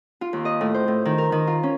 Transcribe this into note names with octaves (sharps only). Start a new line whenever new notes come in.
F4
D#2
D#5
A2
C5
A2
D#3
A#4
D#3
F4
C#4